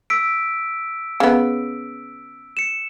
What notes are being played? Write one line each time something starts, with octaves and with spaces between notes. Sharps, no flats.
E6 B6 D7
C#3 B3
C#7 E7